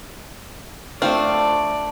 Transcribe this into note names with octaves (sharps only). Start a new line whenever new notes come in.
A3 C4 D4 F4 D5